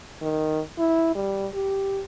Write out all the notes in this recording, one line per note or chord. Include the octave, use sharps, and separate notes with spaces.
D#3
E4
G3
G4